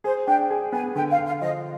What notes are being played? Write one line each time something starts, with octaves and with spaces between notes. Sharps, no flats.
G#4 C5
D4 G5
G#4
B3 G#5
D3 G5
F5
D3
F5
F3 D#5